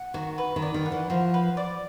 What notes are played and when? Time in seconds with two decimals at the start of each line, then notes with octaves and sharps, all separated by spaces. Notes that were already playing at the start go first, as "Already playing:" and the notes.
Already playing: F#5
0.14 D#3 F#4
0.38 B4
0.56 D#3
0.62 D5
0.74 D#3
0.86 F#5
0.92 E3
1.10 F3 F#4
1.34 B4
1.57 D5